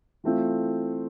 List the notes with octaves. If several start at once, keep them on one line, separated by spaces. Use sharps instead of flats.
E3 A3 C4 F4